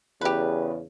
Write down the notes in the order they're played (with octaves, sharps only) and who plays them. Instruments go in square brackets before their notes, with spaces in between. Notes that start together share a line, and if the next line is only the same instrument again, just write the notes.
[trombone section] E2 C#3 [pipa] G4 B4